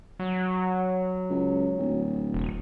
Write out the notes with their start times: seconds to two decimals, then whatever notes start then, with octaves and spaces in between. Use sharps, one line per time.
0.19 F#3
1.30 C#2
1.78 D1
2.34 E1